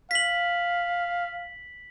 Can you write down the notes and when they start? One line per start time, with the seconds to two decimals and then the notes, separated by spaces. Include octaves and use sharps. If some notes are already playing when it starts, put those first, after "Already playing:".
0.11 F5 B6 F#7